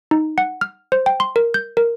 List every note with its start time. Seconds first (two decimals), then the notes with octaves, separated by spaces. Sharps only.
0.11 D#4
0.38 F#5
0.61 F6
0.92 C5
1.06 G5
1.20 C6
1.36 A#4
1.54 G6
1.77 A#4